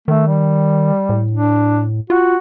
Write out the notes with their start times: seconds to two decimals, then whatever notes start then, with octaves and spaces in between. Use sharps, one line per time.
0.08 D#3 A3
0.27 G3
1.09 A2
1.31 D4
2.10 F4 F#4